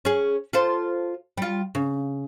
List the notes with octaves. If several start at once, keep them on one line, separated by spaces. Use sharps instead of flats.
C#4 G#4
F4 A4 C5
G3 F4
C#3